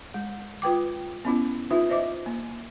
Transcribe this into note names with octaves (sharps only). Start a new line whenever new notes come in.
G#3
F4 B4 G5 D6
B3 C#4 E4
D#4 F4 B4 E5
C5 D#5 E5 D6
A#3